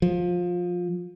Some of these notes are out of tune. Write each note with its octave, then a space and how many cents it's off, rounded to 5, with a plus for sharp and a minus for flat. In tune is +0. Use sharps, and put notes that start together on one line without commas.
F3 +20